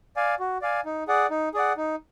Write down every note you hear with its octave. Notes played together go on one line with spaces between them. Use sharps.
D5 F5 G#5
F#4
D5 F5 G#5
D#4
G#4 D5 F#5
D#4
G#4 D5 F#5
D#4